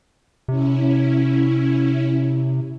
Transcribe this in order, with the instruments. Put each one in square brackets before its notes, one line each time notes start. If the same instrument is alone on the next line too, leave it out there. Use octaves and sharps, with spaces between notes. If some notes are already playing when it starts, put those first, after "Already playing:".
[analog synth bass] C3 [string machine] C#4 E4